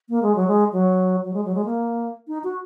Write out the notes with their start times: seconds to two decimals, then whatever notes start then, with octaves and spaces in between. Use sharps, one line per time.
0.09 A#3
0.23 G#3
0.36 F#3
0.47 G#3
0.72 F#3
1.24 F#3
1.34 G#3
1.45 F#3
1.55 G#3
1.65 A#3
2.28 D#4
2.44 F#4